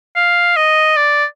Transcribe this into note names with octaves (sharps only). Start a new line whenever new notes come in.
F5
D#5
D5